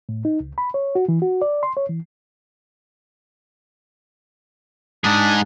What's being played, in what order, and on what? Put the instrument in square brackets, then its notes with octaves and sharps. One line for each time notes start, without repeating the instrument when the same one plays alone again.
[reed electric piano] A2
D#4
C#2
B5
C#5
F#4
E3
F#4
D5
C6
C#5
E3
[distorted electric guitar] G#2 G#4 [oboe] D4